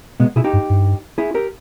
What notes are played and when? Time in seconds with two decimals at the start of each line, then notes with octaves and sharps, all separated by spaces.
0.20 B2 G#3 B3
0.36 B2 E4 G#4
0.44 D#4 G4
0.53 G2
0.70 G2
1.18 E4 G#4
1.34 G4 A#4